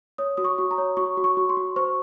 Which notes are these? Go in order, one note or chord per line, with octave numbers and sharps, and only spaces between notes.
C#5 D#6
F#4 D#6
C#6
F#4
A#5
C#5
F#4 C#6
F#4
C#6
F#4
C6
F#4
C5 C#6